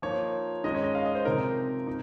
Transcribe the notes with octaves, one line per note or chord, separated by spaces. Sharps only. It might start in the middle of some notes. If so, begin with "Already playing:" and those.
F3 A#3 D#4 C#5
D#3 G#3 C#4 D#5
C#5
D#5
F5
D#5
C5
C3 F3 C4 D#4 A#4
D#4